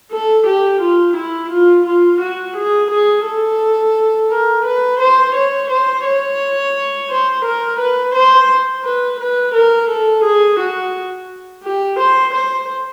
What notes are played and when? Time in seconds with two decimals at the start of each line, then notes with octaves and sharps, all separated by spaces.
0.12 A4
0.47 G4
0.81 F4
1.16 E4
1.51 F4
1.86 F4
2.21 F#4
2.56 G#4
2.91 G#4
3.26 A4
4.30 A#4
4.65 B4
5.00 C5
5.35 C#5
5.70 C5
6.05 C#5
7.10 C5
7.45 A#4
7.80 B4
8.15 C5
8.84 B4
9.20 B4
9.54 A#4
9.89 A4
10.24 G#4
10.59 F#4
11.63 G4
11.99 C5
12.34 C5